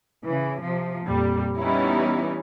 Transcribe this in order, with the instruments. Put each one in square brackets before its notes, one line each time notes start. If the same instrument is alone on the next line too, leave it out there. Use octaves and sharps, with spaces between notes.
[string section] C#3 E3
C3 F3
F2 A#2 G3
E3 G3 B3 C#4 D#4 E4